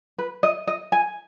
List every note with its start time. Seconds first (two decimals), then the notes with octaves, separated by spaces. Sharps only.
0.18 B4
0.43 D#5
0.67 D#5
0.92 G#5